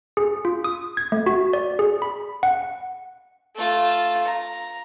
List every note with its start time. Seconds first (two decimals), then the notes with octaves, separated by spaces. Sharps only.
0.17 G#4
0.45 F4
0.64 D#6
0.97 G#6
1.12 A3
1.26 F#4
1.53 D5
1.79 G#4
2.02 B5
2.43 F#5
3.56 A3 F4
4.27 A#5